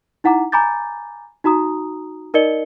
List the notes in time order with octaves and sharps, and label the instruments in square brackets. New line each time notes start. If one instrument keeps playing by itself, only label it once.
[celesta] D#4 E4 F#5 A#5 D6
G#5 A#5 B5 D6 G6 A6
D#4 F#4 A#5 D#6
D#4 A#4 D5 D#5 C#7 G7